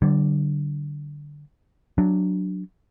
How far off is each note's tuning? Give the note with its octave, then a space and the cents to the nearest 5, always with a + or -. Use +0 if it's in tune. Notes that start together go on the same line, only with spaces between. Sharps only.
D3 +0 G3 -45
F#3 +0 D4 +0